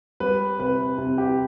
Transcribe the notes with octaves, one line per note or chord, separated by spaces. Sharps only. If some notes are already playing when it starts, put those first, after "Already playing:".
G3 B4
C3 B4
C3
G4